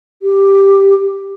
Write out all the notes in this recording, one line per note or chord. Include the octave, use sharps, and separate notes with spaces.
G4